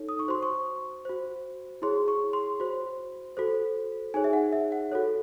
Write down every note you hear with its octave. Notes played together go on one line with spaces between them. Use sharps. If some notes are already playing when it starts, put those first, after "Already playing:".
Already playing: D#4 A4 C#5
D#6
C#6
F#4 C5 C6
C#6
F#4 C5
E4 G#4 C#5 C6
C#6
C6
F#4 C5
F#4 A4 C5
D#4 G#4 C#5 G#5
E5
F#5
E5
F#5
F#4 A4 C#5